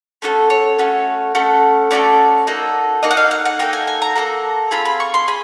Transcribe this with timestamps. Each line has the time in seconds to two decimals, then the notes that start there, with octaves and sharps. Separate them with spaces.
0.22 A3 C#4 F#4 A4
0.50 C#5
0.78 A3 C#4 F#4 A4
1.35 A3 C#4 F#4 A4
1.91 A3 C#4 F#4 A4 D5
2.47 A#3 D#4 F#4 A4
3.03 A#3 D#4 F#4 A4 D#5
3.11 F#5
3.17 F5
3.31 F#5
3.45 F#5
3.59 A#3 D#4 F#4 A4 G5
3.73 G#5
3.87 G#5
4.02 A#5
4.15 A#3 D#4 F#4 A4
4.71 C4 F4 G#4 B5
4.85 B5
5.00 C#6
5.14 C6
5.28 G#4 B5